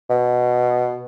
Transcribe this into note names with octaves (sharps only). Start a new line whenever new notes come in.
B2